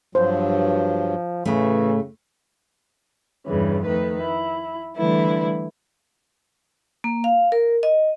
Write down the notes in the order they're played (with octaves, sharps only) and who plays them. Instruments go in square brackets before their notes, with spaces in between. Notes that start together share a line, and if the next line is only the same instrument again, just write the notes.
[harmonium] G2 F#3 [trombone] F3 [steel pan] C5
[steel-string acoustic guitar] A2 A3 [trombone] C#3 [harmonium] E3
[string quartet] E2 G2 C#3 E3
F2 D#3 A3 B4
E4
D3 E3 G3 A3 E4 B4
[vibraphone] A#3
F5
A#4
D#5